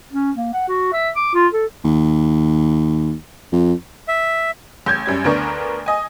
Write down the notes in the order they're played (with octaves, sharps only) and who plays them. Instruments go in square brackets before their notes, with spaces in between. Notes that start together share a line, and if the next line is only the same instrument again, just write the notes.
[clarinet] C#4
A#3
F#5
F#4
E5
D6
F4
A4
[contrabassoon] D#2
F2
[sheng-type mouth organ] E5
[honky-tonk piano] A1 G6 G#6
F#2 G3 G#6
D2 B3 D4 A#4 C#6
D#5 G#5